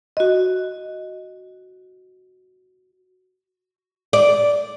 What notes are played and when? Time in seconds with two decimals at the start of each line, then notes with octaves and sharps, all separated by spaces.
0.17 F#4 D#5
4.13 D5